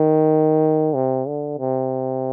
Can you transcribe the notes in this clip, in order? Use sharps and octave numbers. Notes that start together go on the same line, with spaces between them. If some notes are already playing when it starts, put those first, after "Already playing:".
Already playing: D#3
C3
D3
C3